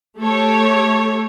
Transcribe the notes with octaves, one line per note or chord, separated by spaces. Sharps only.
A3 G4 A4 C#5